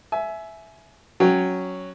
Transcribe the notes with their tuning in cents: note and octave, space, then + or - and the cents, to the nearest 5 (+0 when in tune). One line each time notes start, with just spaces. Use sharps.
E5 +0 G#5 +25
F#3 +0 C#4 +0 G5 +10